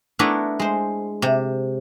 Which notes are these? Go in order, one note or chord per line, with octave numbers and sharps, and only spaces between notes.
A3 B3 D4 E4 A#4 B4
G#3 C5
C3